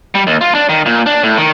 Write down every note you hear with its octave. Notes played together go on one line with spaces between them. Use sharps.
G3
D#2
F4
D4
D#3
A#2
D4
A2
D#3